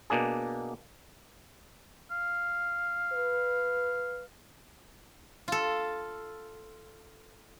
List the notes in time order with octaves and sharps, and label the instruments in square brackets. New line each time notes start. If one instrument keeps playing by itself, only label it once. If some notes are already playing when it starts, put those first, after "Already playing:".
[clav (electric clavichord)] B2 A#3 D4 G#4
[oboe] F5
[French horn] B4
[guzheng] F4 A4